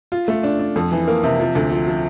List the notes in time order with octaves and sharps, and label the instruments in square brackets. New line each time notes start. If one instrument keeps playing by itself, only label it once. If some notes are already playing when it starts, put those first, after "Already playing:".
[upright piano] F4
A3
D4
D4
F2
E3
A#3
C3
F3
D2
F3
F3